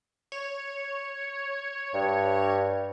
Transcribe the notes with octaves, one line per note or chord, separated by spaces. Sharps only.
C#5
G2